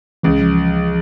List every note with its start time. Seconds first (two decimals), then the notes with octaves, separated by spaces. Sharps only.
0.23 C#2 E3
0.41 F3